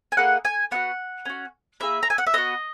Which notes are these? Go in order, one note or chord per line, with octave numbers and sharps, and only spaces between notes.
G#5
A#3 E4 G#4 F#5
G#5
B3 D#4 F#4 F#5
C#4 F#4
A#3 E4 G#4 E5
A#5
G#5
F#5
E5
B3 F#4 D#5